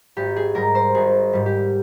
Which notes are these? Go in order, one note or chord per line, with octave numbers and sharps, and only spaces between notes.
G#1 G4
G#4
G#2 G3 A#4
C5
G#1 G#4
G#2 G3
G4